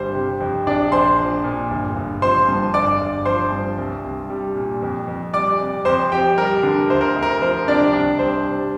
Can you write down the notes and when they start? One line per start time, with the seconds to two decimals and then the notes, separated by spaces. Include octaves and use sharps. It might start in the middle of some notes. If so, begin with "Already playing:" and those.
Already playing: G1 G3 C5
0.14 C3
0.40 F2
0.66 A#1 D4 D5
0.92 A#1 C5 C6
1.19 F3
1.44 A#2
1.71 G1
1.96 G1
2.22 F3 C5 C6
2.48 G2
2.74 G1 D5 D6
3.00 G1
3.25 F3 C5 C6
3.52 G2
3.79 C2
4.04 C2
4.30 G3
4.56 A#2
4.82 F2
5.08 F2
5.33 G3 D5 D6
5.60 C3
5.85 F2 C5 C6
6.12 F2 G4 G5
6.38 G3 A#4
6.63 D3
6.90 D2 C5
7.01 A#4
7.16 D2
7.23 A#4
7.41 F3 C5
7.68 C3 D4 D5
7.93 C2 D4 D5
8.19 C2 C5
8.46 G3